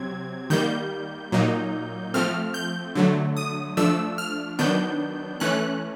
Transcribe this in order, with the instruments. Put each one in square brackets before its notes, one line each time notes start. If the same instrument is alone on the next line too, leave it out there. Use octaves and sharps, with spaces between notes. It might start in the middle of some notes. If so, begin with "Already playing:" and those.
Already playing: [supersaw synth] C3 F#3 C4 G#6
D#3 G3 A#3 G6
A#2 F#3 A#3 D#4
F3 A3 C4 F6
G6
D3 F#3 A3
D#6
F3 A3 D4 E6
F6
D#3 F#3 B3 D4 G6
E3 A3 C#4 F#6